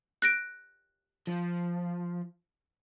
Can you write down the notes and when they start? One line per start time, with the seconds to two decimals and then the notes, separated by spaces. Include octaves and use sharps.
0.22 F#6 A#6 D7
1.27 F3